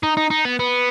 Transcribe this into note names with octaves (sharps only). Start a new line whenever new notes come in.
D#4
D#4
D#4
B3
B3